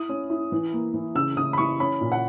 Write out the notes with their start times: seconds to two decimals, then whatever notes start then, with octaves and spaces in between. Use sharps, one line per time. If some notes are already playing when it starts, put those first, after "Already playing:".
Already playing: E4 D#6
0.09 C#4
0.30 E4
0.52 E3
0.73 A#3
0.94 E3
1.15 C#3 E6
1.37 C#3 D#6
1.53 B5
1.58 E3 C#6
1.80 C#4 B5
2.01 A#2
2.12 F#5